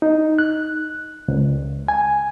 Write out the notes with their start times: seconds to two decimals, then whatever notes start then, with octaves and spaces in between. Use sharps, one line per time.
0.02 D#4
0.39 F#6
1.28 C#2
1.88 G#5